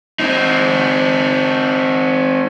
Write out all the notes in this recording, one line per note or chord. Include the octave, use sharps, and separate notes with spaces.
C4 D#4